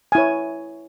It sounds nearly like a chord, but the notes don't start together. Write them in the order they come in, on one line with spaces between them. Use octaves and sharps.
G#5 E4 C#5